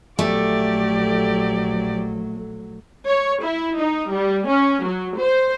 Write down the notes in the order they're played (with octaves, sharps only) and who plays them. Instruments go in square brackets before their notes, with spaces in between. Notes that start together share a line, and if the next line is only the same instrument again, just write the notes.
[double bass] A#1 F#3 [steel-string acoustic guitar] A3 [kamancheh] G4 D5
[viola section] C#5
E4
D#4
G3
C#4
F#3
C5